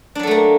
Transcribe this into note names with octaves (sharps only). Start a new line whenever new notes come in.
F#3 A3 A#3 D4 A4